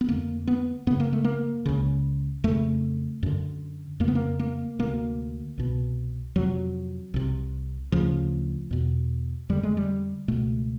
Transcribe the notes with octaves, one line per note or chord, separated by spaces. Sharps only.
B3
F2 D3 A#3
B3
F#2 C#3 B3
A#3
A3
A#3
C#2 C#3
F2 C#3 A3
F#2 D3
F2 C#3 A#3 B3
A#3
A#3
D2 C3 A#3
C2 B2
F2 C3 F#3
C2 C3
D2 C#3 F3
E2 B2
F2 D3 G3
G#3
G3
C#2 B2 A3